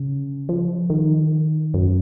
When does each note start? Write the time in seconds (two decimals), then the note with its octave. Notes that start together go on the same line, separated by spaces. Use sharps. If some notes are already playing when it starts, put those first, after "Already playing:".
Already playing: C#3
0.49 F3
0.90 D#3
1.74 F#2